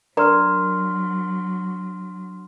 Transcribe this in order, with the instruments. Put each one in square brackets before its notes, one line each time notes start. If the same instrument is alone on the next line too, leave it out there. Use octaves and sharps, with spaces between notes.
[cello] F#3 [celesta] D4 C6 F6 [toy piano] A#4 D5 A#5